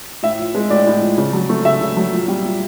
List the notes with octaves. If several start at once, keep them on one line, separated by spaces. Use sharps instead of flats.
A2 E5
F3
G#3
A2 D5
A2
F3
C#3
F#3
A3
C#3 E5
C#3
F#3
A#2
G3
A#2